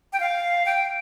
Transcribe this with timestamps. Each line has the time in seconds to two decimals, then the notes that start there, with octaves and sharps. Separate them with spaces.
0.13 G5
0.20 F5
0.66 G5